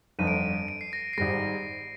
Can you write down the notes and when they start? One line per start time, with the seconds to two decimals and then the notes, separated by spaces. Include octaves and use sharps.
0.19 G1 F2 D3 D#7
0.27 D7
0.36 D#7
0.68 D7
0.81 C7
0.93 A#6
1.13 C7
1.18 G#1 G#2 G3 A#6